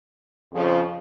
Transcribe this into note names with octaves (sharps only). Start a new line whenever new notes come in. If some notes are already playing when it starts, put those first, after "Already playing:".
F2 C#3 F3